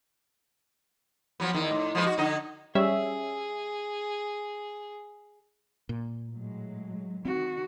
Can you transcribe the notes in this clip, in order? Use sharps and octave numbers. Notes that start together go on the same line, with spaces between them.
F3 F#3 B3
E2 D#3
A2
F3 G#3 B4
F#4
D3 D#4 D#5
G3 C#4 G#4 E5
A#2
A2 F#3 G#3
D#3 C4 F#4